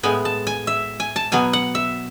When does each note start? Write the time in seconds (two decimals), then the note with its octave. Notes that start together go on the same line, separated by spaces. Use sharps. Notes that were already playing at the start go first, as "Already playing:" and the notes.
0.03 A2 G#3 B3 G#5
0.25 A5
0.47 G#5
0.67 E5
1.00 G#5
1.16 A5
1.32 B2 F#3 B3 G#5
1.53 F#5
1.75 E5